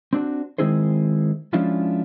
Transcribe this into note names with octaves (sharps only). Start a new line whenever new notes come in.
C4 D4 F#4
D#3 G#3 C4 E4 G#4 C5
F3 G#3 C#4 D4 E4 F4